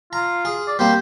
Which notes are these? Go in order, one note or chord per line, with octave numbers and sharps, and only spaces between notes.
F4 A#5
G#4
D5
G3 A#3 C4 C5